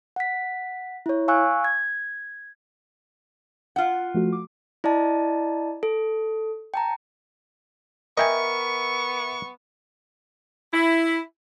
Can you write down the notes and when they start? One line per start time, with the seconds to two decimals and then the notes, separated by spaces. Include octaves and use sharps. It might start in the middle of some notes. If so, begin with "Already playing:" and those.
0.16 F#5 B6
1.06 E4 C#5
1.28 F5 G#5 C#6 E6 F#6
1.64 G#6
3.76 F4 F#5
4.14 F3 A3 F#4
4.32 D6
4.84 E4 D5 D#5 A5
5.83 A4
6.74 G5 A5 A#5
8.17 B3 A#4 D#5 E5 G5 G#5 C#6
10.73 E4